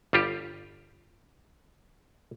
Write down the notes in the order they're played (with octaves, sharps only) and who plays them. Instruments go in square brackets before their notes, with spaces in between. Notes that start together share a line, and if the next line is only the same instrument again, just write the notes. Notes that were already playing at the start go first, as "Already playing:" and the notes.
[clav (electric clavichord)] G1 G3 F4 G4